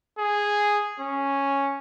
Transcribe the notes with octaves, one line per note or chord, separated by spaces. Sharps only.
G#4
C#4